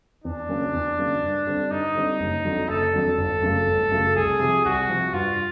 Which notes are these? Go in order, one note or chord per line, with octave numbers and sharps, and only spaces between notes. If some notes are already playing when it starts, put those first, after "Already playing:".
E2 D4
C#3 F#3 A#3 C#4
E2
C#3 F#3 A#3 C#4
G2
D3 G3 C4
G2 D#4
D3 G3 C4
F#1
F2 D3 F#3
F#1 A4
F2 D3 F#3
G1
F#2 C#3 F#3 A3
G1
F#2 C#3 F#3 A3
C2 G#4
C3 F3
C2 F#4
C3 F3
G2 F4